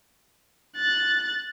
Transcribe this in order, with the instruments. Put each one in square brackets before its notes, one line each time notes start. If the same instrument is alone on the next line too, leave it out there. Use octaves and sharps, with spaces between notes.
[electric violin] F#6 A6